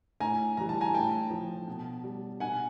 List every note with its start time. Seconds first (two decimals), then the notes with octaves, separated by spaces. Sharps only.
0.20 A2 G#5 A#5
0.57 E3 G3 A#5
0.69 A5
0.81 G#5 A#5
0.94 A2 G5 A5
1.30 F3
1.68 B2
2.04 G3
2.40 B2 F#5 G#5